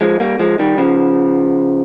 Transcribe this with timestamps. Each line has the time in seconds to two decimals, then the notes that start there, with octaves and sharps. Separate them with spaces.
0.01 F3 G#3
0.20 G3 A#3
0.39 F3 G#3
0.59 D#3 G3
0.78 C#3 F3